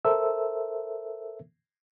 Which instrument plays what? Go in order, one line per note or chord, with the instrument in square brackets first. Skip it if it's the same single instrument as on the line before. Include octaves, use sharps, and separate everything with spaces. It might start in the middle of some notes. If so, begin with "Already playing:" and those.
[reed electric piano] A4 A#4 C5 E5 E6